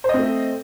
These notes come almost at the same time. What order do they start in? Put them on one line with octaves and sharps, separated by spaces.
C5 D#5 C4 A3